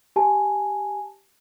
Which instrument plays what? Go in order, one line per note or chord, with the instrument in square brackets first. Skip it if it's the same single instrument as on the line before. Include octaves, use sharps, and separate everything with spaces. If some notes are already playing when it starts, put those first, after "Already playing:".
[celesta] G4 G#5 A5